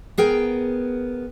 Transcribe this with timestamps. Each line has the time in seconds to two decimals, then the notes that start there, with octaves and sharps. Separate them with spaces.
0.18 B3 G#4 A#4 G5